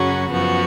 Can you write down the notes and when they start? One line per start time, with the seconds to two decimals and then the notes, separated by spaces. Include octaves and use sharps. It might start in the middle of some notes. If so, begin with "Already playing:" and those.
Already playing: F#2 C#3 F#3 C#4 F#4
0.31 F#2 F3 B3 F#4